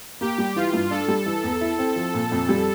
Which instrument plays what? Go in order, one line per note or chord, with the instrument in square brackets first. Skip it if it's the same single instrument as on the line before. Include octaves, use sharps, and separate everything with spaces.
[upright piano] A#3 [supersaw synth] G4
[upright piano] G3
[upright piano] E3 [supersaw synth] F4
[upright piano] G2
[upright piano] D4 [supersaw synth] A4
[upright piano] G3
E3
E2
E4
C4
F3
A#2
F2
G3